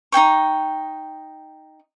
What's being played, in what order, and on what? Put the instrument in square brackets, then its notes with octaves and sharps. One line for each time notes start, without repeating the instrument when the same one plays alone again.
[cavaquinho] D#4 G#4 G5 C#6